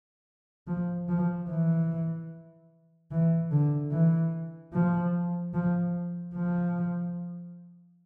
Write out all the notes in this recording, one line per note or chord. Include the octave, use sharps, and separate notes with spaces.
F3
F3
E3
E3
D3
E3
F3
F3
F3